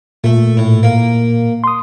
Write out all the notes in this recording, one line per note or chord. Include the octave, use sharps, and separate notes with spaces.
A#2 A3
A2
A#3
C6 D#6